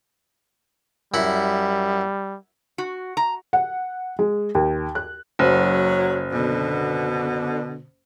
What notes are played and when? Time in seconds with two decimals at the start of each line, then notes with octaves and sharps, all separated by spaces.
1.14 F#2 G3 E4 F#5
2.78 F#4
3.17 A#5
3.53 F#5
4.19 G#3
4.55 D#2
4.95 F#6
5.39 F#1 F#3
6.32 B2 D3